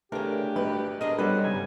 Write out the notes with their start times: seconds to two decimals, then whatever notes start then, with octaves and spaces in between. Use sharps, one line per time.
0.12 C#3 E3 A3 D4 G4 A#4
0.56 G#1 B4
1.01 G#3 D4 A#4 D#5
1.18 G2 F#3 G3 B3 C4 A4 B4
1.44 G#2 C#3 F#3 G3 G#5